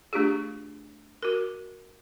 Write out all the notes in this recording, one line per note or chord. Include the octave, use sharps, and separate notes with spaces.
A3 D4 F4 G4 G#4
F#4 A#4